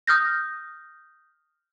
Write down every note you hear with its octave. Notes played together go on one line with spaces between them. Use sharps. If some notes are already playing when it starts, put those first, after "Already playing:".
D#6 F6 G6 A#6